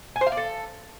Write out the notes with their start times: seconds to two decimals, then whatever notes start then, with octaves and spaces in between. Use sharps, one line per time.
0.16 G#5
0.21 C5
0.26 F5
0.32 D5
0.37 A4